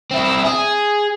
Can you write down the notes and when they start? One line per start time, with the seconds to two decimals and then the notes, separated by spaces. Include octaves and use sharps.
0.11 C4 E4
0.45 G#4